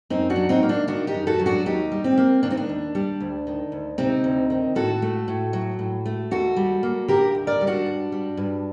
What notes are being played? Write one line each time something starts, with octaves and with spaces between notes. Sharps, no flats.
F#2 C4 D#4
D4 F#4
F#3
C4 D#4
A#3
D4
D#3 D4 F#4
D#4 G4
F#2
F#4 A4
F#3
D4 F#4
D#2 D#4 G4
G3
C4
A#3
D#3 D4
C4
D4
D#2
G3
D2
D#3
D2
C3 C4 D#4
D2
D#3
A2 F#4 A4
A3
A2
F#3
A2
A3
D#2 F#4 A4
G3
A#3
D3 G4 A#4
D#2
A#4 D5
G3
D4 F#4
G2
G3
G2